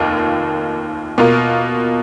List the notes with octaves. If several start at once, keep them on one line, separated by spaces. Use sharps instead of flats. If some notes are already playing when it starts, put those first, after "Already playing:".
Already playing: F1 D#2 D#3 A#3 F4
B2 A#3 F4 A#4